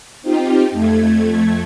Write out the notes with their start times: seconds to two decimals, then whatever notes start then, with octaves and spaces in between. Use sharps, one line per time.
0.22 C4 D#4 F4 G4
0.71 F2 A3 G#6